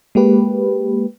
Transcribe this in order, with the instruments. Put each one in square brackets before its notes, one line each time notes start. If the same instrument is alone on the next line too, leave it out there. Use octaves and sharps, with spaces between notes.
[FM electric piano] G#3 A#3 G4 B4